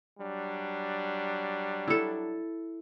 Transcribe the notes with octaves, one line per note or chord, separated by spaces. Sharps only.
F#3 G3 D4
E4 A4